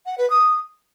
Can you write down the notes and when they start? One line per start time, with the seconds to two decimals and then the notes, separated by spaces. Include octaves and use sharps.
0.06 F#5
0.18 B4
0.30 D#6